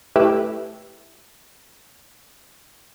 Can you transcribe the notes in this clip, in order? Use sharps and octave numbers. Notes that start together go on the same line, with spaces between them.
A3 E4 G4 B4 E5